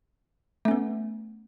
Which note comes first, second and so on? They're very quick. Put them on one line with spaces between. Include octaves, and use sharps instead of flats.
A3 C#4 B3